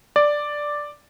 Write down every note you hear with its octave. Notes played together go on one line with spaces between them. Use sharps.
D5